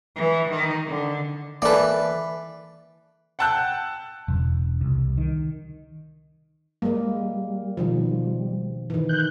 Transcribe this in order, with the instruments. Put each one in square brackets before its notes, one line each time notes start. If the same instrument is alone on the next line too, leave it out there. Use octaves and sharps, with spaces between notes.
[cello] E3
D#3
D3
[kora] E3 [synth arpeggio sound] A#3 A4 [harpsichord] B4 D5
[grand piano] F#5 G5 A5 E6 F#6 G6
[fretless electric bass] E1
C2
D#3
[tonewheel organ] G3 [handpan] G#3 A#3
[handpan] B2 D#3 F3
D#3 E3
[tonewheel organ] F#6 G6